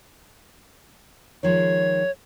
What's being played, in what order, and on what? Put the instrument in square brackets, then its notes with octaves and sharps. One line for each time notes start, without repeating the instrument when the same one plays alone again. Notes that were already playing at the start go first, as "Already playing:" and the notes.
[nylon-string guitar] D#3 F3 G#3 [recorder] C#5